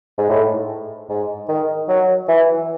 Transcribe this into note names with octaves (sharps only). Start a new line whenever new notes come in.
G#2
A2
G#2
D#3
F#3
E3